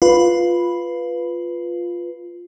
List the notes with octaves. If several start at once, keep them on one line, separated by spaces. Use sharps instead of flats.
F4 B4